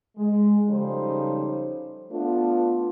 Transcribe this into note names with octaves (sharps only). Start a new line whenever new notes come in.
G#3
C#3 F3 G3 D#4 A4 C5
A3 B3 D4 F4